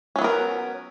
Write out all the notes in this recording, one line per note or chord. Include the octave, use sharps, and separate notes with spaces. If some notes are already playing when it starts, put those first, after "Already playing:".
F#3 B3 C#4 A#4